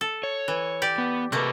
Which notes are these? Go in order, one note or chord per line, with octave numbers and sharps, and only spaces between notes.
A4
C#5
E3
G4 D5
B3
C3 A3 A#3 B4